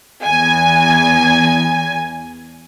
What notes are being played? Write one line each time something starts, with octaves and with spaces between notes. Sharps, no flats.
E2 G#5